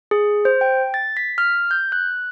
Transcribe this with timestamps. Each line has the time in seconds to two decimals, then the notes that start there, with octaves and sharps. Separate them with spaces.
0.11 G#4
0.45 C5
0.61 G5
0.94 A6
1.17 B6
1.38 F6
1.71 G6
1.92 F#6